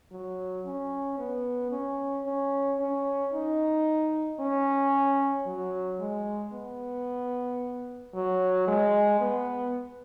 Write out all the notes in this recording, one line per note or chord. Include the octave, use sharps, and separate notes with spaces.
F#3
C#4
B3
C#4
C#4
C#4
D#4
C#4
F#3
G#3
B3
F#3
G#3
B3